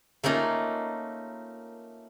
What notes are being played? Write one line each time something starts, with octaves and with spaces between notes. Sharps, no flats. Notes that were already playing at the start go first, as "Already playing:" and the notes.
A3 A#3 C#4 D#4 F4